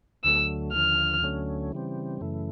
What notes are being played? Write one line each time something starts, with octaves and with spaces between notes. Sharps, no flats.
D2 D3 F#3 A3 E6
D#2 D3 F3 F6
D2 D3 F#3 A3 C#4
C#3 E3 G3 C4
F#2 C#3 E3 A3